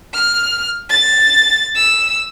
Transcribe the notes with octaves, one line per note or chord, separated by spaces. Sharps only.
F6
A6
E6